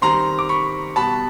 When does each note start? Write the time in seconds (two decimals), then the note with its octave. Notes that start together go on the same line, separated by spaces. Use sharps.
0.02 D#3 G3 C4 A#5 C6
0.39 D6
0.49 B5 C#6
0.96 B2 G3 B3 A5 B5